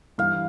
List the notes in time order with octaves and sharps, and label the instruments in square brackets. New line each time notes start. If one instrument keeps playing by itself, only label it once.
[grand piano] G2 E3 G3 [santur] F5